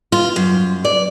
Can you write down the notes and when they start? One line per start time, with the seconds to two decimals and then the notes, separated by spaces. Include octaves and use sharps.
0.12 F4
0.36 F#2
0.85 D5